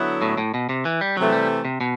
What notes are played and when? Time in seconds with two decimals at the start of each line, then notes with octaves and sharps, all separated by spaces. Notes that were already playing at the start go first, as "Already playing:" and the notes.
Already playing: D3 F#3 B3 E4
0.22 A2
0.38 A2
0.54 B2
0.69 C3
0.85 E3
1.01 G3
1.17 C3 E3 F#3 A3
1.33 G3
1.65 C3
1.81 B2